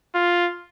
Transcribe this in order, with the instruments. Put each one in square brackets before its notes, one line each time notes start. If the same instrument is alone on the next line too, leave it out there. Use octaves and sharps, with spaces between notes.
[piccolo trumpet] F4